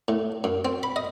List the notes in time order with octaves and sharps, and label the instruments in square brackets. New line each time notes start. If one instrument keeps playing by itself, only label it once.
[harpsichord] A2
F#2
C4
B5
D#5